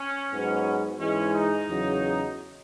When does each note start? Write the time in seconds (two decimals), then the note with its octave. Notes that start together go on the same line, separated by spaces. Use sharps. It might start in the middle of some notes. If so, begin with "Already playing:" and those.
Already playing: C#4
0.30 G#2 F#3 B3
0.99 G#2 E3 G#3 C#4
1.33 D#4
1.66 E2 C#3 F#3